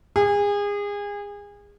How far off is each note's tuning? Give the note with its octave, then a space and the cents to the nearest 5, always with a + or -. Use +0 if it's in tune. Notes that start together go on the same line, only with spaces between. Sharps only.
G#4 -30